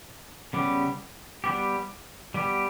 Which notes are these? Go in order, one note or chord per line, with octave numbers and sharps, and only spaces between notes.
C#3 G3 B3 G4
G3 B3 G4
G3 B3 G4